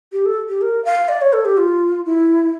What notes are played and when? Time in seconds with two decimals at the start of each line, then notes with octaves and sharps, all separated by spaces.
0.12 G4
0.25 A4
0.49 G4
0.61 A#4
0.85 F5
1.09 D5
1.21 C#5
1.33 A4
1.45 G4
1.58 F4
2.06 E4